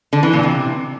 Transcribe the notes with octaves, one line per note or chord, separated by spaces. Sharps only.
D3
E3
A#2
C3